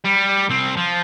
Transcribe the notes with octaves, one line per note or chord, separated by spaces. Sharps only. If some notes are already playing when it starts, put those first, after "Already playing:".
G3
C2 C4
F3